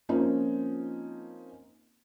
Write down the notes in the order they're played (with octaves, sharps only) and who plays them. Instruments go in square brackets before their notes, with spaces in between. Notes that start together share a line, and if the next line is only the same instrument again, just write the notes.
[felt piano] F3 A#3 C4 C#4 D#4